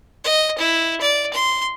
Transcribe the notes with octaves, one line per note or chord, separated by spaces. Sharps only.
D#5
E4
D5
C6